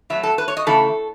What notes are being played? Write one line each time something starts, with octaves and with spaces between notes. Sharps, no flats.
B2 F#3 A3 E5
A4
B4
C#5
D#5
C#3 E3 A3 E4 A4